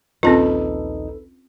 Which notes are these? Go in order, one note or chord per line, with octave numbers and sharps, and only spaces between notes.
A#1 D#2 C4 C#4 D#4 F4 A4 B4